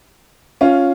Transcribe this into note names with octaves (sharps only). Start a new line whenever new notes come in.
C#4 F4